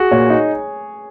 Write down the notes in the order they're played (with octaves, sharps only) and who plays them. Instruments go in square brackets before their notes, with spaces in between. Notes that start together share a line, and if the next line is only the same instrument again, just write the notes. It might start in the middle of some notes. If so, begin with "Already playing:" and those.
Already playing: [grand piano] F#4 [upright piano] G#4
[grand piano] A#2 [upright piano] C#5
[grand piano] D#4